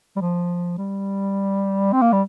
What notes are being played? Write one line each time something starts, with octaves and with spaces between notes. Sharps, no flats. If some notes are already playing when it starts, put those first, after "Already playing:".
G3
F3
G3
C4
A#3
G3